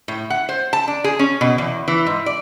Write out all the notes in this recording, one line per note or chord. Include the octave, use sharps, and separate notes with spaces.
A2
F#5
C5
A5
D4
G#4
C#4
B2
E2
E3
G#2
D5